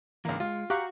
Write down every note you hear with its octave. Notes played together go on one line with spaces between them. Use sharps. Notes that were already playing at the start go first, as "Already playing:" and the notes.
C#2 G#2 D3 E3 A#3
G#3 F4
F#4 G4 F5 A#5 C#6 F#6 C#7